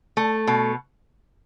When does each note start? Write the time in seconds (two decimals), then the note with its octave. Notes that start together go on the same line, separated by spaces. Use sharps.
0.17 A3
0.47 B2